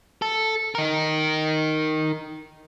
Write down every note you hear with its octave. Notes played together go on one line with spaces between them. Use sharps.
A4
D#4 A#4